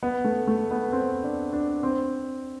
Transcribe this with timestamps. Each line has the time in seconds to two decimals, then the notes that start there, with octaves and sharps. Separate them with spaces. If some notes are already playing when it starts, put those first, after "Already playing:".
0.03 B3
0.24 A3
0.47 A3
0.71 B3
0.93 C4
1.24 D4
1.53 D4
1.83 C4